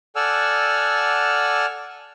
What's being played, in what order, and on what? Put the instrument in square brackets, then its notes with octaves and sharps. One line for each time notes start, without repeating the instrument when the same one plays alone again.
[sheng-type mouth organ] A4 D5 F#5 G#5 E6 F6